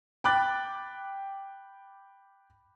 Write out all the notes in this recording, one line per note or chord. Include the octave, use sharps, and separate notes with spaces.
G5 B5 D6 F#6 A6